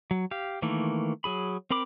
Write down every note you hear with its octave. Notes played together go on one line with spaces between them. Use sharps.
F#3
G4 F5
D#3 E3 A3 A#3
F#3 G#4 B5
C4 A#4 B5 D6